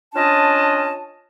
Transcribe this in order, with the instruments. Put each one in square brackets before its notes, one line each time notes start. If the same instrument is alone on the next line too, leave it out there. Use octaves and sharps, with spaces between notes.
[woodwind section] C#4 D4 F4 D#5 A5